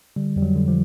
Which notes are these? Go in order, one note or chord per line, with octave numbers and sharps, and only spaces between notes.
D3 G3
F2 G3
F#3
D3
F3